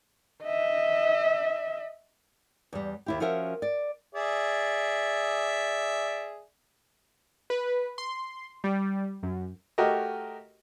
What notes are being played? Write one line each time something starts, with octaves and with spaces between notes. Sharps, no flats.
D#5 E5
E2 G3
D#2 E4 G4
F3 C#4 F#4 A#4 D#5 E5
D5
G#4 D5 E5
B4
C6
G3
F#2
A3 F#4 G4 A#4 D#5